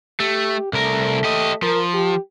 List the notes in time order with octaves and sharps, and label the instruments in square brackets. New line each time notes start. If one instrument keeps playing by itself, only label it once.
[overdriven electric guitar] A3 [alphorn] G4
[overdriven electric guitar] C2 A#4 [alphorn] A3
[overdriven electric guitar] G4 D#5
[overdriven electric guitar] F3 [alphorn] A#4
[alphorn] G4